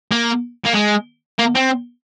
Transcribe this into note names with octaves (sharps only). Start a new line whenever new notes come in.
A#3
A#3
G#3
A#3
C4